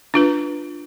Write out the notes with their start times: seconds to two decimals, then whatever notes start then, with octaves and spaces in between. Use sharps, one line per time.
0.14 D4 F4 B4